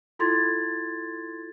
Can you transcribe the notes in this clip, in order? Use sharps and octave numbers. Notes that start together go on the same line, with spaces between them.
E4 F4 A4 C6 G#6 A6